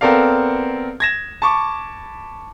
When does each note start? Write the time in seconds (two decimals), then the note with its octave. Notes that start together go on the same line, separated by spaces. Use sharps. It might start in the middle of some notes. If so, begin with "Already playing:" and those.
0.01 B3 C4 A4 A#4 D5 F5
1.00 G#6 A#6 E7
1.42 A5 B5 C#6 D6